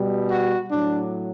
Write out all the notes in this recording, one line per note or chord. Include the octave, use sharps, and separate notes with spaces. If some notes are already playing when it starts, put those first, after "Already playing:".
Already playing: B2 G3
F#4
A2 F#3 D4